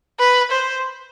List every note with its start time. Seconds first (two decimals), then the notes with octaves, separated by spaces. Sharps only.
0.20 B4
0.51 C5